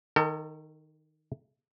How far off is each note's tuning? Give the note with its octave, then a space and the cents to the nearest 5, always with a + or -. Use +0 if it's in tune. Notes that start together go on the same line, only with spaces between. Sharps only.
D#3 +0 A4 +40